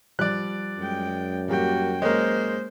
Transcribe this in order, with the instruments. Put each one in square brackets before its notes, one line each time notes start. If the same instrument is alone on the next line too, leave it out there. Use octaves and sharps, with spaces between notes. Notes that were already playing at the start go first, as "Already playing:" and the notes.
[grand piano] F3 G3 [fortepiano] D5 F#6
[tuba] F#2 [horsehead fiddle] G#3 G5
[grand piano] G3 A#3 G4 [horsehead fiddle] F#4 G5
[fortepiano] G#3 A#3 [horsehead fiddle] C5 [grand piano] C#5